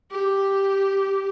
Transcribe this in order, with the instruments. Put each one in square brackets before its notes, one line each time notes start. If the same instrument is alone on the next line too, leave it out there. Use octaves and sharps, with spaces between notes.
[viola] G4